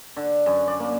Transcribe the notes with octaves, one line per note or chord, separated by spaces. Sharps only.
D3
F#2
D5
A#3